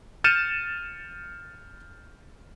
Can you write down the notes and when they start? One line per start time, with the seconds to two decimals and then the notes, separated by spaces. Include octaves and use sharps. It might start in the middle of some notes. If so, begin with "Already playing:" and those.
0.24 F6 G6 A6 C#7 D#7 E7